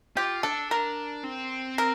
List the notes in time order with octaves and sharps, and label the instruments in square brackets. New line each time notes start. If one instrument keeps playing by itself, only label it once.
[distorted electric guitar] F4 [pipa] G4
[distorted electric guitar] D4 [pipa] A4
[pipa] A#4
[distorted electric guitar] C4
[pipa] A#4